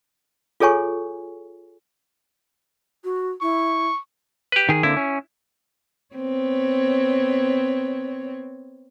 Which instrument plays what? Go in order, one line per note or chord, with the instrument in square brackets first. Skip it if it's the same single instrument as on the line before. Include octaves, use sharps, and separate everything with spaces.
[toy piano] F4 G#4 A4 C#5 G#5 C#6
[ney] F#4
[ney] E4 [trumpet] C#6
[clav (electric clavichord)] G4 B4
[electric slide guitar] D#3 G#4
[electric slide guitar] D3 A#3 C4 [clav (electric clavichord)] E4
[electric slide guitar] C#4
[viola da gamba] B3 C4 C#5